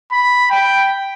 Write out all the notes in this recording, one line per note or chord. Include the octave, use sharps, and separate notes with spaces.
B5
G5